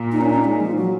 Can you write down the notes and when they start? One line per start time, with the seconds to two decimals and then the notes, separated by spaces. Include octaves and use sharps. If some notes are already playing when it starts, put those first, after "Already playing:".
Already playing: A#2
0.12 D#4
0.21 C#4
0.29 D#4
0.44 G#3
0.60 F3
0.77 F#3